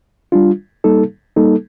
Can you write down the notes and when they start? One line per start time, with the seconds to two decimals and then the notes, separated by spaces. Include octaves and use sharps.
0.32 G3 D4 F4
0.84 G3 A#3 D#4 A4
1.37 G3 A#3 D#4 A4